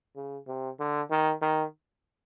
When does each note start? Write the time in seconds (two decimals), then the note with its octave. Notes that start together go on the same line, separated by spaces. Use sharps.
0.16 C#3
0.48 C3
0.80 D3
1.11 D#3
1.42 D#3